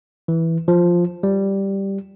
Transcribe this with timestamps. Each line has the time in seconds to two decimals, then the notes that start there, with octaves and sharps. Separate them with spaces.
0.28 E3
0.68 F3
1.23 G3